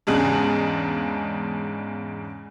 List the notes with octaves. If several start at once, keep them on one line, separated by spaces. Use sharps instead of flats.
E2 G#2 C#3 G#3 D4